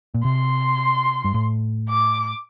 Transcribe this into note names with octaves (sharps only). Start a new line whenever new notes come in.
A#2
C3 C6
G2
A2
D6